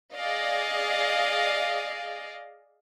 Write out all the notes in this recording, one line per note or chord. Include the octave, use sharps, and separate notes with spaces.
G#4 D5 D#5 F5